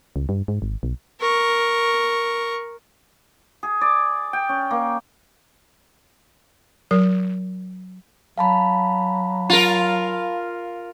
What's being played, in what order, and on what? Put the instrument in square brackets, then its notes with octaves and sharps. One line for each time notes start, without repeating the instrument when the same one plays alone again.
[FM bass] C#2
G2
G#2
G#1
B1
[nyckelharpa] A#4 C#6
[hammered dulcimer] G#4
D5
G5
C#4
A#3
[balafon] F#3 A#4
[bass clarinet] F#3 [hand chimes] F5 A5 B5
[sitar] F4 A#4